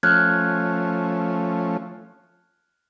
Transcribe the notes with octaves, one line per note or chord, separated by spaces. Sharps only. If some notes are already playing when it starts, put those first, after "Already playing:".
F3 A3 C#4 F6 F#6 G#6